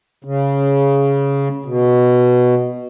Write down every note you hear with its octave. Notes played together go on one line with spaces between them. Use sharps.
C#3
B2